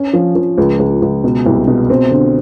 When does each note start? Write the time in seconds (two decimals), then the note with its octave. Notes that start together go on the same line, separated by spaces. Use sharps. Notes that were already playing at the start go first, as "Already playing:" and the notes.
Already playing: C#4
0.13 F3
0.35 F3
0.58 C#2
0.79 C#2
1.02 C#2
1.24 B2
1.46 C2
1.67 B2
1.90 C4
2.11 D3